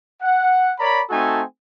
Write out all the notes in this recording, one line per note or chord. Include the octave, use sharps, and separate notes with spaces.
F#5
A#4 C#5 D5 A#5 B5
A3 C4 D#4 F#4 A4 G#5